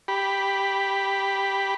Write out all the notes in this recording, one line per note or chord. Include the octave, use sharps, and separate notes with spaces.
G4 B5